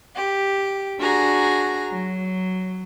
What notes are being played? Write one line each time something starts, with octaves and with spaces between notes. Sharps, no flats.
G4
D4 F#4 G#4 A#5
F#3